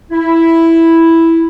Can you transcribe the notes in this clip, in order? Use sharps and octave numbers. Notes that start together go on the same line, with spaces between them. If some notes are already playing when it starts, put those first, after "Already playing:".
E4